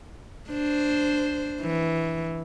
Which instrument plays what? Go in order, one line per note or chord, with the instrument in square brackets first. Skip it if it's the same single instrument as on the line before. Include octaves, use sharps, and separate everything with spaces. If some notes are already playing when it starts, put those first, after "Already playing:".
[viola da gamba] D4 C5
E3